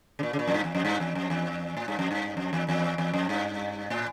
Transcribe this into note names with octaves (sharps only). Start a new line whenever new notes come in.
C#3
A#2
C#3
A#2
F2
G2
E2
F2
G2
E2
F2
E2
A2
G2
F2
G2
F2
E2
E2
E2
F2
G2
A2